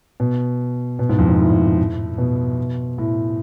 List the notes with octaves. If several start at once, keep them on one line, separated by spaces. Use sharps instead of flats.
B2
B2
G#2
F2
G#2
A2
B2
A2